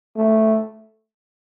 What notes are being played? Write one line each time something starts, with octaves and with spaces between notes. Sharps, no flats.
A3